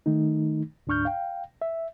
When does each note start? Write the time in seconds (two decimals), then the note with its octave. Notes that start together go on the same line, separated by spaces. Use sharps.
0.06 D#3 A3 D#4
0.87 D2 G#2 D4 C#6 F6 G6
1.05 F5 G5
1.62 E5